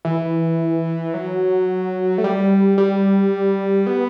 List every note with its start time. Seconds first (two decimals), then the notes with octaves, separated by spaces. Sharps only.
0.05 E3
1.14 F#3
2.18 A3
2.24 G3
2.78 G3
3.87 B3